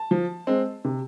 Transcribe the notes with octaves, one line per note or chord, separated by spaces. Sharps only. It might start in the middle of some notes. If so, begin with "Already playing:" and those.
Already playing: A5
F3
G#3 C4
C3